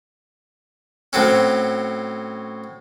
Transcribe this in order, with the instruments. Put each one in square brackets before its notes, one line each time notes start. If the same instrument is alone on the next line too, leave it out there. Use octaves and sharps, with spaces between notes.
[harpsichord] A2 F#3 C4 C#4